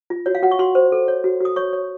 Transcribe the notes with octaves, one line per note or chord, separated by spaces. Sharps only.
F4
F#4 C#5
F5
F#4 F#5
C#6
F#4 C6
C5
A4
C#5
F#4
F#4 D#6
C#5 C#6
C#5